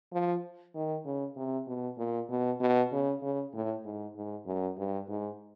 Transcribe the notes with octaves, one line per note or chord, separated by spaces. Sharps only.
F3
D#3
C#3
C3
B2
A#2
B2
B2
C#3
C#3
A2
G#2
G#2
F#2
G2
G#2